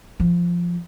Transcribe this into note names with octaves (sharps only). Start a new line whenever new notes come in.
F3